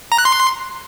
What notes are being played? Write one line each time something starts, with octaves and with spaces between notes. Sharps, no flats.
A#5
F#6
C6